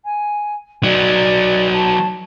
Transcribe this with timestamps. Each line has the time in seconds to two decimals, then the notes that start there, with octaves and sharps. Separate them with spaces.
0.04 G#5
0.83 F#3 D#4 D5
1.73 A5